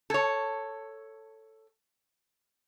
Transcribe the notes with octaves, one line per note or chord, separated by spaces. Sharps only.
A4 C#5